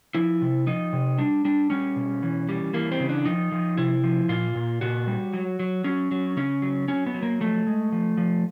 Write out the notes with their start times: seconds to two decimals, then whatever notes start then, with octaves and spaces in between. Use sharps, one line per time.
0.15 F3 E4
0.42 C3
0.67 F3 D#4
0.93 C3
1.19 G3 D4
1.45 G3 D4
1.70 G3 C#4
1.96 B2
2.23 E3
2.49 G3
2.74 E3 A#3
2.92 C4
3.00 C#3
3.09 D4
3.26 F3 D#4
3.52 F3
3.78 C3 E4
4.04 F3
4.29 A#2 F4
4.55 A#2
4.81 A#2 F#4
5.07 G3
5.34 F#3
5.60 F#3
5.84 F#3 C#4
6.11 F#3
6.37 C#3 C#4
6.62 F#3
6.88 F#3 C#4
7.06 B3
7.14 F#3
7.23 A#3
7.41 F3 A3
7.67 G#3
7.92 F3
8.17 F3